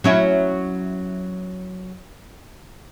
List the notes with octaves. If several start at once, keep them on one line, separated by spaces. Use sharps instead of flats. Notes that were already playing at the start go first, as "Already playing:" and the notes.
F#3 C#4 E4